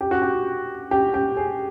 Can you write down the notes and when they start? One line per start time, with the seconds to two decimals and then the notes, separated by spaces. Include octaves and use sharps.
0.01 G4
0.11 F#4
0.22 G4
0.91 G4
1.14 G4
1.37 G#4